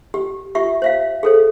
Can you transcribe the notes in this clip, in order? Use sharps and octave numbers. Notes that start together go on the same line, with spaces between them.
G4
F4 G4 E5 C#6
C5 E5 F5
G#4 A4 C5